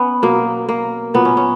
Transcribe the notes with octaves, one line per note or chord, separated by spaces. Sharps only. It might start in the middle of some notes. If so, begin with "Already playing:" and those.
Already playing: B3 C#4
B2 F#3 A#3
A#3
A#2 F#3 B3
C#4
C#4